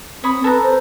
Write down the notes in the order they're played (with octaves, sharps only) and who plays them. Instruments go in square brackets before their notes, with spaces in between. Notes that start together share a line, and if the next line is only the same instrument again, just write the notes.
[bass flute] C4 [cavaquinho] C#5 B5 D#6
[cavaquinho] A4 A#5 [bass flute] B4
[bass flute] C5